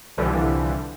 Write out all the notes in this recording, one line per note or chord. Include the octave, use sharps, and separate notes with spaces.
C2 D3 E3 F3 G3